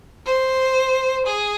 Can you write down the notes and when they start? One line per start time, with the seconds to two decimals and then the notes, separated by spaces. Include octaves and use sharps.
0.26 C5
1.26 G#4